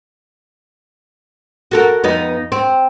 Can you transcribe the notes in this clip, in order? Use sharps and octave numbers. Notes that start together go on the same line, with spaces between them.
F#4 A4 A#4
F2 B3 D#4
C4